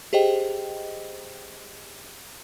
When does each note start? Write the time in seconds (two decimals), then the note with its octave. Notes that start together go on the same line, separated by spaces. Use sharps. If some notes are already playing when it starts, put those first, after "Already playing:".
0.13 G4 G#4 C5 D#5 G5